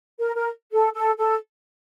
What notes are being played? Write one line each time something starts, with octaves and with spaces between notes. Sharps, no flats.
A#4
A#4
A4
A4
A4